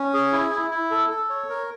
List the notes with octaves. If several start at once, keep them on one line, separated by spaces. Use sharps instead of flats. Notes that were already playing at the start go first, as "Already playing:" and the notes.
Already playing: C#4
G#4
E4
E4
E4
A4
A4
C#5
A#4